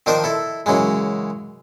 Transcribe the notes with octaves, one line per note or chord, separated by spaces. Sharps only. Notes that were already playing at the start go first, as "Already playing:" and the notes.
D#3 F3 D4 D#4 A#4 C5
E4 A4
F#2 C#3 E3 G#3